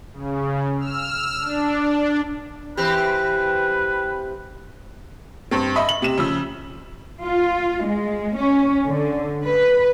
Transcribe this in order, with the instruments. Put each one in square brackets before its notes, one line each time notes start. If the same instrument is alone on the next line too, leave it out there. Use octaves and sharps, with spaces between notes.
[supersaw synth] C#3
E6 F6
D4
[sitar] E3 C4 G4 [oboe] B4
[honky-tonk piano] G2 C4
D#5 E5 B5
F#7
C3 E7
C#3 F3 E6
[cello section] F4
G#3
C#4
D3
B4